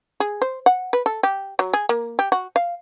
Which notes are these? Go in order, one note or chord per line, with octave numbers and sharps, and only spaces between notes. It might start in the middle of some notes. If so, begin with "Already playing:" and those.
G#4
C5
F#5
B4
A4
G4
F#3
G#4
A#3
G4
F#4
F5